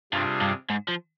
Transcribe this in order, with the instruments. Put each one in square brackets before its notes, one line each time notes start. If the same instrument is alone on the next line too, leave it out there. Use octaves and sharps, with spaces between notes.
[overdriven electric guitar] G2 [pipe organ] C3 G3 D4 F4 G#4
[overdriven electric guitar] G2
G#2
F3